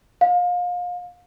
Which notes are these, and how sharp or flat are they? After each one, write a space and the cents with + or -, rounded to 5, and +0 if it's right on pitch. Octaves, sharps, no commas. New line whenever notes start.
F5 +30